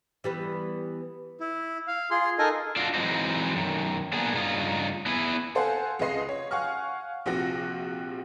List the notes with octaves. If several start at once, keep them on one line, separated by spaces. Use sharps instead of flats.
E3 G3 B3
E4
F5
F4 G#4 C6
D#4 A4 A#4 D#5 G#5
D4 F4 F#4
E3 F#3 G#3 C4 D#4
F#2 D#3
A#3 B3 D4 G#4
G2 C#3 D#4 F4
B3 E4 G#4 B4
A4 C5 F5 F#5 G#5
C#2 C#3 B4 D#5 C6 C7
C#5
F5 F#5 G#5 C#6 F6
A#1 C3 F3 C4 F#4 A#6